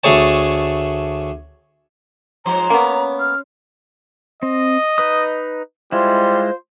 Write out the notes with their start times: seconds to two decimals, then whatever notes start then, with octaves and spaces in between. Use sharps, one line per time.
0.04 D2 A3 G#4 C#5 A5
2.45 G#2 F3 C5 A#5
2.70 A#3 B3 C#4
3.20 F6
4.43 C4 D#5
4.98 D#4 B4 D#6
5.92 G3 G#3 E4 F4 C5